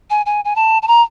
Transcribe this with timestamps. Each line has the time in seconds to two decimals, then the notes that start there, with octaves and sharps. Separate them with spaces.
0.10 G#5
0.26 G#5
0.45 G#5
0.56 A5
0.82 A5
0.88 A#5